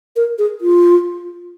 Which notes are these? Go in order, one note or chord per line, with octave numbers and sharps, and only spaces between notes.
A#4
G#4
F4